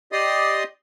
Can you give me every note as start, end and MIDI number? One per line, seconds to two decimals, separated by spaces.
0.12 0.64 67
0.12 0.64 74
0.12 0.64 75
0.12 0.64 84
0.12 0.64 87